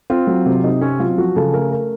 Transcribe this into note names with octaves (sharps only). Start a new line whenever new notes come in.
C4 F4
F#3
C3
C3 D#4
C4 C#4
F#3 F4
F3 F#4
C#3 A4
A3 A#4
A#4